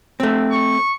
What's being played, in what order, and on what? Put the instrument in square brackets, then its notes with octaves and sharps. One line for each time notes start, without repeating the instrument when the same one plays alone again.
[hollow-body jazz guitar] A3 C4
[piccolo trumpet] C#6